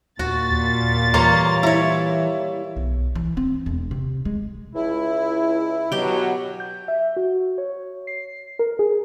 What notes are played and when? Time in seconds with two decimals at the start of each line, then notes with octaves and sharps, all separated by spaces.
0.19 D#2 A#2 F#4 A6
0.52 D#2
1.14 E3 G3 A#3 C#5 A#5 C6
1.63 E4 C#5 A#5
2.76 B1
3.15 E3
3.37 C4
3.66 E1
3.91 C3
4.25 G#3
4.75 C#2 E4
5.92 B2 F#3 G4 G5
6.60 G6
6.88 E5
7.17 F#4
7.58 C#5
8.07 C7
8.59 A#4
8.79 G#4